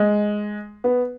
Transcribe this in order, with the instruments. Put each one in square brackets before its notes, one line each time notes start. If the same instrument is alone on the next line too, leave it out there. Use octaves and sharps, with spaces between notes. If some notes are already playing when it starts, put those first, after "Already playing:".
Already playing: [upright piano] G#3
B3